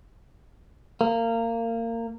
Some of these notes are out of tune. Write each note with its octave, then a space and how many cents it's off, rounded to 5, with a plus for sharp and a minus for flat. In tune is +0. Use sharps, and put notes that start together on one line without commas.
A#3 -25